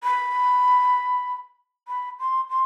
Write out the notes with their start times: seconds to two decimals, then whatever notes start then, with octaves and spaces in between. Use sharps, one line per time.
0.04 B5
1.88 B5
2.19 C6
2.49 C6